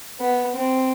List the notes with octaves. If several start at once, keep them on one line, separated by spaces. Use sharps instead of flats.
B3
C4